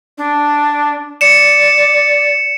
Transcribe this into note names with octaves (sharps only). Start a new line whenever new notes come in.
D4
D5 C#7 E7